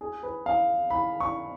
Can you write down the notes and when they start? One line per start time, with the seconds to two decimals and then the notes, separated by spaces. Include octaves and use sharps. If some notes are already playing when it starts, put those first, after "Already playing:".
0.01 G#4
0.23 B4
0.46 F5
0.90 B5
1.20 C#6